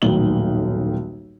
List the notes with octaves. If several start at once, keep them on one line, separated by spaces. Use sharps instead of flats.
D#1 B1 A2 D#3 F#7 G7